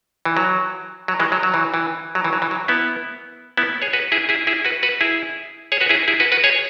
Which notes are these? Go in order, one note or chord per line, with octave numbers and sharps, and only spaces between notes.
E3
F#3
F#3
E3 G#3
F#3
F#3
E3
E3
F#3
E3
F#3
E3
F#3
B3 E4
B3 E4
G#4 C#5
F#4 B4
E4 G#4
E4 G#4
E4 G#4
F#4 B4
F#4 B4
E4 G#4
G#4 C#5
F#4 B4
E4 G#4
E4 G#4
F#4 B4
F#4 B4
G#4 C#5